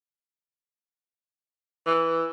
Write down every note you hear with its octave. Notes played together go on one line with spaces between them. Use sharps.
E3